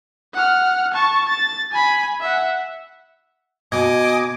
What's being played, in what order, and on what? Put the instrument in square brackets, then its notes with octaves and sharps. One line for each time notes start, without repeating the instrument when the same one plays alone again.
[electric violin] F#5 F6
A5 C#6
A6
G#5 B5
E5 F#5
[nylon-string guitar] B2 [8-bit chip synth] D#5 G#5 [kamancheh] D6 [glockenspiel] G#6